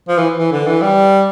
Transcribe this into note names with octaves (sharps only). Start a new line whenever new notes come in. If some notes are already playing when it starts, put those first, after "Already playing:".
F3
E3
E3
D3
E3
G3